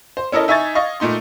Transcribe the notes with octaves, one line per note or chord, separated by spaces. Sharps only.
C5
C#4 E4 A4 A#4 D#5
D#4 E5 G#5 C#6 G#6 A6
D#5 F5 C#6
A#2 A3 D#4 C6